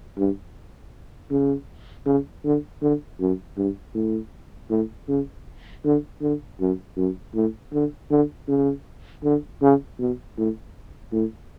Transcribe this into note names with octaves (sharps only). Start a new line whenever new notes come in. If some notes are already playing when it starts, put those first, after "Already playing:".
G2
C#3
C#3
D3
D3
F#2
G2
A2
A2
C#3
D3
D3
F#2
F#2
A2
D3
D3
C#3
D3
C#3
B2
A2
A2